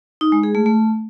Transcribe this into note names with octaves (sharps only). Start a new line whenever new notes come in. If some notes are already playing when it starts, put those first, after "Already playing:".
D#4
G#3
G#4
A3
A3